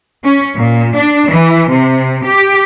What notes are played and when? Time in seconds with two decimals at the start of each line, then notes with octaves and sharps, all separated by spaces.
0.24 C#4
0.56 A#2
0.95 D4
1.30 E3
1.70 C3
2.26 G4